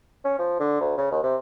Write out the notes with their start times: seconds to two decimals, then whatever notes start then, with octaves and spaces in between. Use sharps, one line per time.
0.25 C#4
0.39 F3
0.60 D3
0.81 D2
0.98 C#3
1.12 D#2
1.23 C3